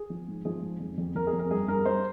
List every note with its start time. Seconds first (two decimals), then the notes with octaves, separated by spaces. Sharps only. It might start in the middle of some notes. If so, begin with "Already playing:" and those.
Already playing: G#4
0.10 F3
0.28 G#2
0.45 F3 G#4
0.62 G#2
0.80 F2
0.98 F2
1.15 F2 A#4
1.27 G#4
1.33 F2
1.39 A#4
1.50 G2 G#4
1.68 G2 A#4
1.85 G2 C5